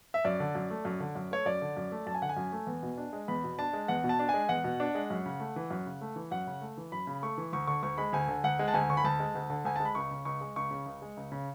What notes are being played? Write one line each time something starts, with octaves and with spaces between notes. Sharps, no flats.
E5
F#2 D5
D3
F#2
A3
F#2
D3
F#2
A3 C#5
F#2 D5
D3
F#2
A3
F#2 A5
G#5
D3 F#5
G#5
F#2
A3
E2
B2
D4
G#3
E2 B5
B2
D4 A5
G#3
E2 F#5
B2
A5
D4
G#5
G#3
E2 F#5
B2
D4
G#3
F#2
C#3
A3
E3
F#2
C#3
A3
E3
F#2 F#5
C#3
A3
E3
F#2 B5
C#3
A3 C#6
E3
D2 C#6
D3 C#6
D2 C#6
G#3 B5
D2 G#5
D3
D2 F#5
G#3
A5
D2 G#5
D3 C#6
B5
D2 A5
G#3
D2
D3
D2 G#5
G#3 A5
B5
C#2 C#6
C#3
C#2 C#6
G#3
C#2 C#6
C#3
C#2
G#3
C#2
C#3